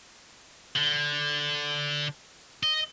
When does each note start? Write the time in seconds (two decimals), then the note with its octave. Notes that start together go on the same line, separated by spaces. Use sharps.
0.76 D3
2.63 D#5